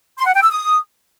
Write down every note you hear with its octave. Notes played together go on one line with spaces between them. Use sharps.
C6
F#5
G5
E6
D#6